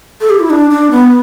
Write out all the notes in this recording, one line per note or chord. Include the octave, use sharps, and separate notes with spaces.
A4
G4
E4
D4
D4
B3